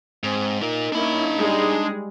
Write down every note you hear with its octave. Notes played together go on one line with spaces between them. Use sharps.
G#2 C4
D#4 F4 A#4
A#3 C#4 D4 E4 B5
G3 G#3 G#4